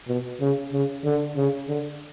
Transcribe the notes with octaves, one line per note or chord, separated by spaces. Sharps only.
B2
C#3
C#3
D3
C#3
D3